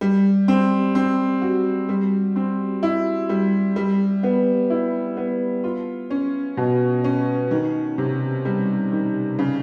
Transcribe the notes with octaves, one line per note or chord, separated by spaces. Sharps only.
G3
C4
C4
F#4
G3
C4
E4
G3
G3
B3
E4
B3
F4
C#4
B2
C#4
D#3
C3
G3
D#3
C#3